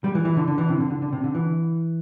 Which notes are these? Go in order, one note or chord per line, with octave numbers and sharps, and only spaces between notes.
G3
E3
E3
D3
D3
E3
C3
D3
D3
D3
C3
D3
E3